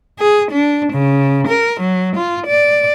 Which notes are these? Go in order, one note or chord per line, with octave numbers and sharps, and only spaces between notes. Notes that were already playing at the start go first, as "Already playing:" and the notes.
G#4
D4
C#3
A#4
F#3
F4
D5